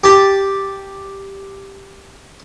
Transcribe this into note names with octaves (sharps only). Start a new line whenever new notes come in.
G4 A5